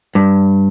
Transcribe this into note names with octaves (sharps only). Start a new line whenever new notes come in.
G2